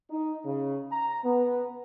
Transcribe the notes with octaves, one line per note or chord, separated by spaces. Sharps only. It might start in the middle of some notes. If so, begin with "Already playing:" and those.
D#4
C#3
A#5
B3